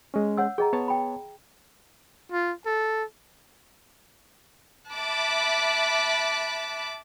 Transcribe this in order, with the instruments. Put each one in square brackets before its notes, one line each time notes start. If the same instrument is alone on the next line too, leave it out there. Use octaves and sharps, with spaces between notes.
[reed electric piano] G#3 C#4
[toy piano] C#5 F#5 E6
[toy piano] G#4 D#5 A#5 [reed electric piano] G5
[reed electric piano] B3 C#5 A5
[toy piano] G5 B5
[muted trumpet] F4
A4
[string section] E5 A5 B5 D6 F#6